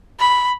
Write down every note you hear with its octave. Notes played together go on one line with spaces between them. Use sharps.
B5